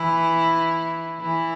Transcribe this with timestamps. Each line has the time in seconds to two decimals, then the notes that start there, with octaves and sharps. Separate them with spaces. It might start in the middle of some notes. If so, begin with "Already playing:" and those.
Already playing: E3 E4
1.21 E3 E4